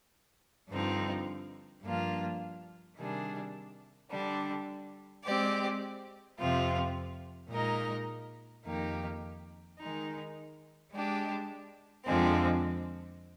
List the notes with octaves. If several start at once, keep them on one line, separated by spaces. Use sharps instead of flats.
G2 D3 F3 C4 D#4
G2 F3 A#3 D4 F4
C3 D#3 G3 D4 G#4
D3 G3 D4
G#3 C4 G4 D5
F2 C3 F3 C4 F4
A#2 G#3 D#4 A#4 D#5
F2 D#3 A#3 D#4 G4
D#3 G#3 D#4
G#3 D4 G4
F2 D3 F3 G#3 C4